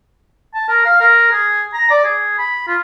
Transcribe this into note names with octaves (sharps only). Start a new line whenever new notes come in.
A5
A#4
F5
A#4
G#4
A#5
D5
G#4
B5
F4